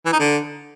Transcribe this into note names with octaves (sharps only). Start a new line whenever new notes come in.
E3
D#4
D3